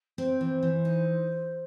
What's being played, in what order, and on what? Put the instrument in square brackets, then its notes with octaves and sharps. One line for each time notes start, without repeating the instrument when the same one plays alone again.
[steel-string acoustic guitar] C4 [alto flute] C5
[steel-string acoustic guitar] E3
E3
D#4